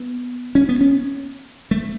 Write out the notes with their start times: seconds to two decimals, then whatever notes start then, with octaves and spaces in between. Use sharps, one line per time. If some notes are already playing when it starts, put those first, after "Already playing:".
Already playing: B3
0.55 C#4
0.69 B3
0.81 C#4
1.71 A3